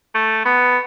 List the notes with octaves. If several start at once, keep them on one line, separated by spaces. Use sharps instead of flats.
A3
B3